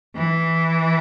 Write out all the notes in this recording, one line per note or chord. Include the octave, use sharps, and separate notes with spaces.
E3